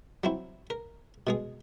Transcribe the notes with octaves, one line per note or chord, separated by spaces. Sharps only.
F#3 C4 E4
A#4
B2 G#3 G#4